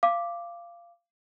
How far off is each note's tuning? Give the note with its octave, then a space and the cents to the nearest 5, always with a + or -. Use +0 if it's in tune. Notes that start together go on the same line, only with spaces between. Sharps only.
F5 -20 D6 +0